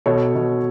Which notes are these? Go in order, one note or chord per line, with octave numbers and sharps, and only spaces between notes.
B2 A4 C#5
B2